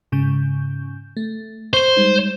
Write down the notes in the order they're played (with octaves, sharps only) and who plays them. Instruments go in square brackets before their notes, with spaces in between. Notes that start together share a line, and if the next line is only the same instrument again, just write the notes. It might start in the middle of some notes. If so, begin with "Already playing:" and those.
[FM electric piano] G#2 C#3 G6
A3
[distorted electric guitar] C5 [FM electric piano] C#6
[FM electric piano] G3 G#3 D#4